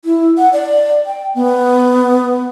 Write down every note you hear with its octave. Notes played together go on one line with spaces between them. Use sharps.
E4
F#5
D5
G5
B3